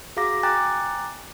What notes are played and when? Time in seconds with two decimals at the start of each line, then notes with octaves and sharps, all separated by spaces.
0.17 F#4 G#4 F5 A#5 D6 A#6
0.43 G5 G#5 A#5 D6 F#6 A6